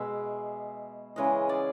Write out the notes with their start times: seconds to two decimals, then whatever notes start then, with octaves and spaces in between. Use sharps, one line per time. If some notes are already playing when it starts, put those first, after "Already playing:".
Already playing: B2 G#3 E5
1.16 C#3 E3 G#3 D#5
1.49 D5